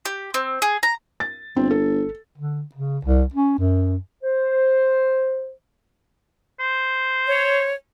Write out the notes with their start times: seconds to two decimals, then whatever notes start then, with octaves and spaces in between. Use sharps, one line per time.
0.05 G4
0.34 C4
0.62 G#4
0.83 A#5
1.20 A6
1.56 G1 C4
1.71 A4
2.38 D3
2.75 C#3
3.05 C2
3.34 C#4
3.59 F#2
4.23 C5
6.60 C5
7.27 C#5